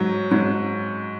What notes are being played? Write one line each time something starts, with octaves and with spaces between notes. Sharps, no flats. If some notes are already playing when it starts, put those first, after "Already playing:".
Already playing: G#2 F#3
G#2 F#3